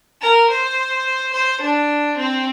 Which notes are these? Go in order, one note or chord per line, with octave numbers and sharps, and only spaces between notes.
A#4
C5
C5
D4
C4